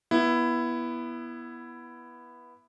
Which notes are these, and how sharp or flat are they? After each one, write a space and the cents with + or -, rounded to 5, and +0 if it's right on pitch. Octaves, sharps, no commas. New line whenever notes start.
B3 -15 E4 +10